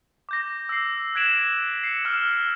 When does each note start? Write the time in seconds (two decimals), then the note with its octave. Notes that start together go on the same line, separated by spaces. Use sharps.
0.29 D6 G6 A#6
0.69 E6 C7
1.15 F#6 G#6 B6 D7 E7 F#7
1.83 C7 C#7
2.05 E6 F6 E7